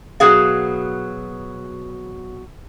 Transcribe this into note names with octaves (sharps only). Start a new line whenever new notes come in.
B2 F#3 G#4 F5